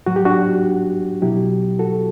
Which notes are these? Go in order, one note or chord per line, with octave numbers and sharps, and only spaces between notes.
A2 F#3 F#4
G4
D4 F#4
B2 F#3 E4 G4
F#4 A4